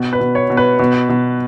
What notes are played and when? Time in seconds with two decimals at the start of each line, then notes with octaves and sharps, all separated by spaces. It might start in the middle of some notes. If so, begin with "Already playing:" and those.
Already playing: B2
0.13 B4
0.20 B2
0.35 C#5
0.50 B2
0.57 B4
0.79 B2
1.09 B2